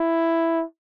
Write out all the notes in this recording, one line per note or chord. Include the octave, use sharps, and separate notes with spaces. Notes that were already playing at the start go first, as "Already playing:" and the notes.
Already playing: E4